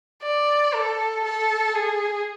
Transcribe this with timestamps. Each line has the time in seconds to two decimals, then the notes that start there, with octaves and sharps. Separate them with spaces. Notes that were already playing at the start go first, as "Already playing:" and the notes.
0.23 D5
0.74 A4
1.24 A4
1.75 G#4